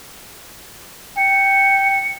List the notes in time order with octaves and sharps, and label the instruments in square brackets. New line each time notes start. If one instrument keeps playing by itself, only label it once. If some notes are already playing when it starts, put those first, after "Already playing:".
[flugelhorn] G5 [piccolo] C#7